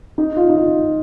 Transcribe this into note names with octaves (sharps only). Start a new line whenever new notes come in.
D#4
F4
D#4
F4